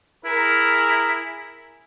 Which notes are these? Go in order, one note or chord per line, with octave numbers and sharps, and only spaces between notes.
E4 G#4 A#4